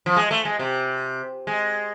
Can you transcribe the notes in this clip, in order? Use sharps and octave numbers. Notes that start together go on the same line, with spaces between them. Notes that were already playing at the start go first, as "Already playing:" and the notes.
F3
G#3
A3
G#3
C3
G#3